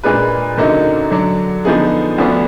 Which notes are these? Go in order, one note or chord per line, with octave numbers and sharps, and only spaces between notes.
A#2 G#3 D4 G#4 B4
F#2 D3 F#3 A#3 D#4
D3 F#3 D4
D3 F3 B3 D#4 G#4
D2 D3 F3 B3 D4